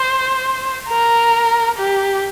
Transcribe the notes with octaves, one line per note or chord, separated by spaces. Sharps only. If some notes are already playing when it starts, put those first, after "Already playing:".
Already playing: C5
A#4
G4